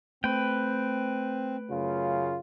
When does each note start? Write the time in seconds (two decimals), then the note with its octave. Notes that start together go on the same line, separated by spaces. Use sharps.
0.24 A3 C4 B4 G5
1.71 F#2 C#3 F4